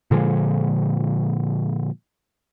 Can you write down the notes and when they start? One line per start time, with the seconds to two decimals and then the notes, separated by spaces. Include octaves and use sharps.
0.11 A#2 D3 F3 G#3